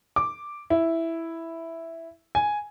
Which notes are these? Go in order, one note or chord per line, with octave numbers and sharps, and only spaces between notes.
D6
E4
G#5